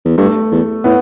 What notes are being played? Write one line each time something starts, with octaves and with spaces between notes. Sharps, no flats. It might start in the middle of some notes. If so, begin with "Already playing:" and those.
E2
G2 A3
E2
A2 B3